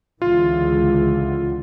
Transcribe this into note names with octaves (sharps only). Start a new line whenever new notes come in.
C#2 D3 E3 F4